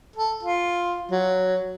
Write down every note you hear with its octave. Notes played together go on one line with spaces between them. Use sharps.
A4
F4
F#3